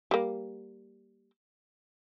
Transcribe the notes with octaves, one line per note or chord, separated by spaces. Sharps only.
G3 A#3